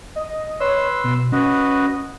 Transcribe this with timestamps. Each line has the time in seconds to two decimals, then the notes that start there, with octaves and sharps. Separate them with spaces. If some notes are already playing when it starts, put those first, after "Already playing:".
0.16 D#5
0.60 B4 C#5 C6 E6
1.04 B2
1.32 C#4 F#4 B4 D#5